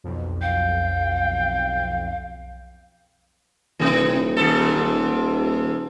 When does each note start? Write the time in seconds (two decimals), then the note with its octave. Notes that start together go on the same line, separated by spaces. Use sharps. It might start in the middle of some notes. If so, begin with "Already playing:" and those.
0.04 B1 F2
0.42 F5 G5
3.79 D#1 C3 E3
4.36 D#2 G#2 A4
4.76 D#1